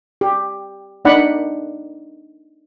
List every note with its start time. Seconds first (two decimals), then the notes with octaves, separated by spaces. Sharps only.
0.21 G4
1.05 A#3 D4 D#4 D5 F#5 B5